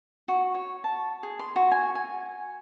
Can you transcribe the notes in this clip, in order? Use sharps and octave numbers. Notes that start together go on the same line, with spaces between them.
F#4
C#5
A5
G#4
C6
F#4
G#5
G#5